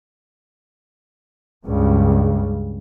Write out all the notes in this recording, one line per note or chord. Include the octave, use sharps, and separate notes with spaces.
C#2 G2 C#3